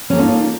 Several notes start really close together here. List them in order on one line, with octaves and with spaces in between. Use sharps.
C#4 A#3 A4 F4 D#4